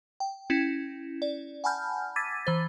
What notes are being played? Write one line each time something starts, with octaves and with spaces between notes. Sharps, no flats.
G5
C#4 E4
D5
F#5 G#5 A5 B5 F6 G6
D6 E6 G#6 A6 B6 D#7
E3 C5 A6